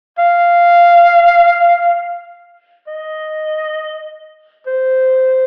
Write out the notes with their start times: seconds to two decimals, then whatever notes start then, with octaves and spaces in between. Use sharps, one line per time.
0.19 F5
2.87 D#5
4.67 C5